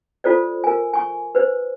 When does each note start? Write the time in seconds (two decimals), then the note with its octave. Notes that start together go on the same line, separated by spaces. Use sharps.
0.24 F4 A4 C5 D5
0.64 A#4 G#5
0.93 G#5 C#6
1.35 B4 C5